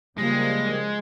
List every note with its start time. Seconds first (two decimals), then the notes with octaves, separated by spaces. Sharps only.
0.18 C#3 F3 G3 G#3 A#3 A#6